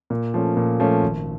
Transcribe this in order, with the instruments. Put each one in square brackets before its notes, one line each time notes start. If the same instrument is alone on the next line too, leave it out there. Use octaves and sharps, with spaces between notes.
[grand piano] A#2
F3 A3 C#4
A#2
F3 A3 C#4
G#1